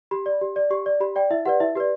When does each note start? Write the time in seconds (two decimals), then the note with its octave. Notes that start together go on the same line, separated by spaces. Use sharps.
0.11 G4 B5
0.26 D5
0.41 G4
0.56 D5
0.70 G4 C#6
0.86 D5
1.00 G4 B5
1.16 D5 G5
1.31 E4 E5
1.46 G4 B4 D5 F#5
1.60 E4 E5
1.75 G4 B4 D5